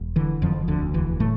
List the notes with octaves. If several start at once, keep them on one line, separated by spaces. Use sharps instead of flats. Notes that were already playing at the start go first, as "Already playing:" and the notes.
Already playing: E1
D3 E3
E1 F2 F3
D2 D3
E1 E3
A2 A3